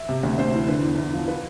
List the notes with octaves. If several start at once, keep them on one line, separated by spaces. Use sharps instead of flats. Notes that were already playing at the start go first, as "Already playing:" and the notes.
Already playing: E5
C3
D2
D2 C5
E3
D3 B4
E2
E2
F3
F3 B4